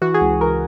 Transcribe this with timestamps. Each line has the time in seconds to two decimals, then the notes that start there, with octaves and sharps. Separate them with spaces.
0.02 E3 F#4
0.14 G#4
0.21 C#2
0.41 E3 A#4